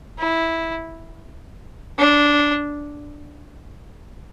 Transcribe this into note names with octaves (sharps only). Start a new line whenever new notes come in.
E4
D4